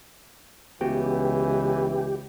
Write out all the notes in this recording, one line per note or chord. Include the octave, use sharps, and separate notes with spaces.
C#2 E3 B3 F#4 G4 G5